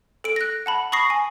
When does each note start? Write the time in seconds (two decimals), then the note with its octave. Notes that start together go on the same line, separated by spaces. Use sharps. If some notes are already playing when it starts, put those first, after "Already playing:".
0.24 A4 D7
0.36 F#6 A#6
0.66 F#5 A5 B5
0.92 B5 C#6 D#6 A#6 C7
1.10 G#5